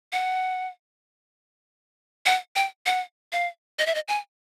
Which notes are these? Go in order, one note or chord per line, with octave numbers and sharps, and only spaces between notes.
F#5
F#5
G5
F#5
F5
D#5
E5
D#5
G#5